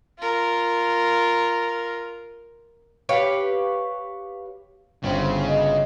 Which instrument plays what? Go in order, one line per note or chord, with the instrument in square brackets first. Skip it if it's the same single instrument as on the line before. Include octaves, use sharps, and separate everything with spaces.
[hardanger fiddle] F4 A#4
[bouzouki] G4 B4 C#5 F5
[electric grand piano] G1 [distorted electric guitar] C#3 [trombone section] F#3 C4
[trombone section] B2 G#3 [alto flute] D#5